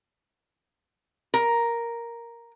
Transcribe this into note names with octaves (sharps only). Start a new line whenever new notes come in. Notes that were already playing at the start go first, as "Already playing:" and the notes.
A#4